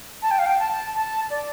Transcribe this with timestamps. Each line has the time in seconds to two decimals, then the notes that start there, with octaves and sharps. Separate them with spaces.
0.22 A5
0.31 G5
0.39 F5
0.46 G5
0.59 A5
0.95 A5
1.30 D5